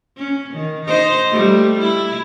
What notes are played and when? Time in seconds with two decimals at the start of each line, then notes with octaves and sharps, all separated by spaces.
0.17 C#4
0.54 D#3
0.86 D#4 C5 D#5
1.31 G3 A3
1.81 E4